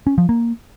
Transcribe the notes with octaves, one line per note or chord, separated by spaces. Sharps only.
C#4
F3
A#3